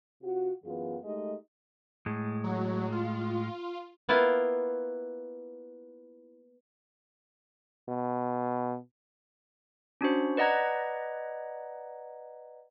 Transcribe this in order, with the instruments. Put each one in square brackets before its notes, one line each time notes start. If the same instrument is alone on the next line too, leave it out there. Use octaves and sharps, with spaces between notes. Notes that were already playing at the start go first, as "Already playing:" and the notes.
[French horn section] C3 F4 F#4
F#2 E3 B3 F4 G#4
G#3 A3 D#4 G4 D#5
[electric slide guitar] A2 G#3
[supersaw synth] F#3
F4
[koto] A#3 B3 E4 F4 F5
[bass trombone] B2
[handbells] C#4 D4 F#4 C5
B4 D5 D#5 F#5 A#5 G#6